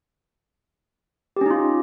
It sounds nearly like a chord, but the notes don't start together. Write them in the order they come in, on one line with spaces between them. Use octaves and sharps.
G4 C#4 D#4 F4